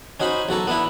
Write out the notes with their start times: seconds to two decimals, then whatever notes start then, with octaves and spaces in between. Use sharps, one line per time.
0.20 C#4 D#4 F#4 C5 B5
0.49 B1 F#4 A4 A#5
0.67 B3 D4 E4